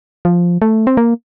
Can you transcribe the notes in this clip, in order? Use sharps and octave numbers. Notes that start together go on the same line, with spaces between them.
F3
A3
C4
A#3